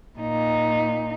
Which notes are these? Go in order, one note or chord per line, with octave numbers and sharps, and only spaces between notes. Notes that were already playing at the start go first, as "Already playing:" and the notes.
A#2 D#4